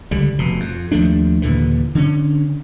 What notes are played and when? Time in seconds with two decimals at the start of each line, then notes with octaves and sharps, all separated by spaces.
0.11 C#2 D3 G3
0.39 F1 B2
0.60 F2
0.92 D#2 F3 A3 D4
1.42 D#2 A#2 D3 E3
1.95 D3 C#4